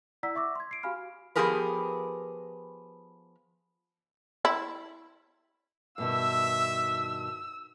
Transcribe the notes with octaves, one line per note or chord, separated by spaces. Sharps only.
E4 D5 F#5 A#5 E6 B6
E5 C#6 D6 E6 A#6
C6 G#6
C7 D7
F#4 G4 F5 G#5 B5 F6
F3 B3 G4 G#4 A#4 B4
E4
G2 B2 D#3 E5 E6